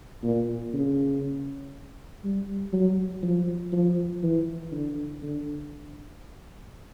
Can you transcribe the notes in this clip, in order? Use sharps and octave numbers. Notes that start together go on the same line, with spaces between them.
A#2
C#3
G3
F#3
F3
F3
E3
D3
D3